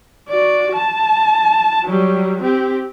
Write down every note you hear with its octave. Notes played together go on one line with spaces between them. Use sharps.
F#4 D5
A5
F#3 G3
C4 G4